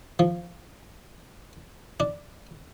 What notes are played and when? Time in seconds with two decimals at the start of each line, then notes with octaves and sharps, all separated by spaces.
0.19 F3
2.00 D4